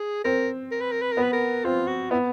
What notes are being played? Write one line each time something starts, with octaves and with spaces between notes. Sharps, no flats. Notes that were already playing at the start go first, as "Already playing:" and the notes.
Already playing: G#4
C4 A#4
A#4
B4
A#4
B4
B3 A#4
B4
A#4
C4 F4
F#4
B3 E4